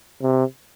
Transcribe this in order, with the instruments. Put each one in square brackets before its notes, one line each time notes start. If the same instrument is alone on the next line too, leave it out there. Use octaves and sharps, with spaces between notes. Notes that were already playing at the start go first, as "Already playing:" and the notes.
[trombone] C3